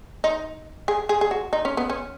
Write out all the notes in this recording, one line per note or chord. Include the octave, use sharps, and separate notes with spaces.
D#4
G#4
G#4
G#4
F#4
D#4
C#4
B3
C#4